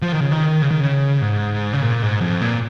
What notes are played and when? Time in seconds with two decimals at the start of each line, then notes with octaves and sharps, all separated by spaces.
0.02 F3
0.13 D#3
0.21 C#3
0.31 D#3
0.62 C#3
0.71 D#3
0.80 C#3
1.21 G#2
1.73 C#3
1.82 A#2
2.02 G#2
2.21 F2
2.42 A#2